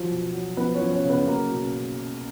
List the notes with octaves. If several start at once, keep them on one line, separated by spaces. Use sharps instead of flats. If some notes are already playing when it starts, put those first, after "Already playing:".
Already playing: F3 F#3 F4
B2
F#3
F3 B3 B4
C#4 C#5
F3
C#4 C#5
C#3
B3 B4
F#3 A#3 A#4
B2